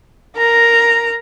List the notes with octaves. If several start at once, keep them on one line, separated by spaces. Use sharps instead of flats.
A#4 A#5